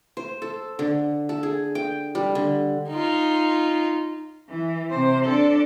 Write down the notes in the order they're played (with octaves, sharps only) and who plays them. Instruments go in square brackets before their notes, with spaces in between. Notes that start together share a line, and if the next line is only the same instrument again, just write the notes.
[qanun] C5
A4
D3
A4
G#4
G5
G3
D3
[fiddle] D#4 F4
[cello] E3
C3 C5
D4 A4